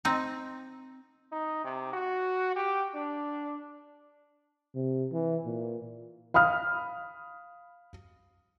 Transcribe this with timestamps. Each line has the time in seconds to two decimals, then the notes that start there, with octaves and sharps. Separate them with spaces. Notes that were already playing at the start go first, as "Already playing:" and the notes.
0.05 C4 D#4
1.32 D#4
1.64 C3
1.93 F#4
2.56 G4
2.94 D4
4.75 C3
5.12 E3
5.45 A#2
6.34 F5 B5 D#6 F6